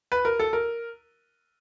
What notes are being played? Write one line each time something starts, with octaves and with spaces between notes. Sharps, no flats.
B4
A#4
A4
A#4